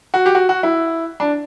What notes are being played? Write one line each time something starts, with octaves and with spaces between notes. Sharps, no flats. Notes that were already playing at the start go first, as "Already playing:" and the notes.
F#4
G4
F#4
F#4
E4
D4